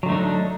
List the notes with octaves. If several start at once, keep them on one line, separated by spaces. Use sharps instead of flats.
D3 F#3 A3 D4 D#4